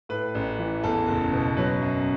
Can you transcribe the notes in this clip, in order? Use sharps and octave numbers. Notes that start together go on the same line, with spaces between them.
A2 B4
A1
E3
E2 A4
F#1
B2
F#3 B4
F#2